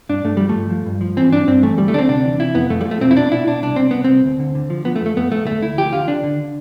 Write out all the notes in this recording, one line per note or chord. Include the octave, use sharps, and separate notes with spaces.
G2 D4
G2 A3
F3 G3
A3
G2
F3
G2
F3
E3 C4
G2 D4
G2 C4
E3 A3
D2 G3
A3
D2 C4 D4
C3 D4
E3
C3 E4
F2 B3
F2 A3
G3
F3
A3
B2 C4
E4
B2 D4
B2 E4
B2 D4
C2 D4
C2 C4
C2 B3
C2 C4
D2
D3
D3
F3
F3 B3
A3
F2
A3
F2 B3
F2 A3
D2 A3
D2 E4
F3 G4
D3 F4
D3 D4
D3